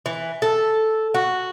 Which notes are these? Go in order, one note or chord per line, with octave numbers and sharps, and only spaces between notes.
E3
A4
F#4